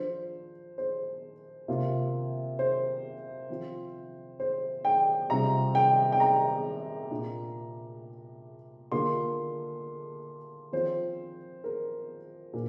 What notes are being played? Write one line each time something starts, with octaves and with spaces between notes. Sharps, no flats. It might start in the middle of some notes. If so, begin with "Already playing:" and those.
Already playing: F3 D4 F4 C5
C5
C3 A#3 F4
C5
F3 C4 F4
C5
G5
C3 G3 C4 F4 A#5
G5
G5
A#5
A#2 A#3 D4 F4
D3 A#3 D4 F4 C6
F3 C4 F4 C5
A#4
A#2